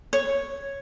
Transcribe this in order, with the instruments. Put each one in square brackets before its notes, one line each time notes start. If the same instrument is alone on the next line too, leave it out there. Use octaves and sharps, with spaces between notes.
[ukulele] C#5